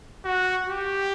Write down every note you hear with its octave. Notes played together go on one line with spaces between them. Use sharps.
F#4
G4